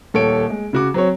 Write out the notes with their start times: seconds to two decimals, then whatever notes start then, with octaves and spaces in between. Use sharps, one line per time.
0.14 D#1 A4 C#5 D7
0.50 G#3
0.73 C#3 F#4 D6
0.94 F#3 C4 C#5